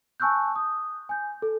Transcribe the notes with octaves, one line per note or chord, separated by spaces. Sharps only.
G#5 A5 C#6 E6 F#6 G6
D#6
G#5 G6
A4